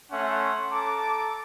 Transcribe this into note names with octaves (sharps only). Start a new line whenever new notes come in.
A3 C#4 E5 F#5 C6
A4 A5 A#5 D6